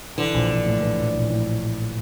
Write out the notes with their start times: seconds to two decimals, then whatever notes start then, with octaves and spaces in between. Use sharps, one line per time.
0.18 D3 E3
0.34 A#1
0.51 A#1
0.66 A2
0.82 E3
0.98 A#1
1.15 A#1
1.30 A2